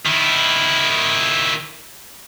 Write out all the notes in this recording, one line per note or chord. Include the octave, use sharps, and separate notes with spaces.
D#3 E4